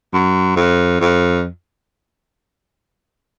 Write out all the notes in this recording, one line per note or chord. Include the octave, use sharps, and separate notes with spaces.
F#2
F2
F2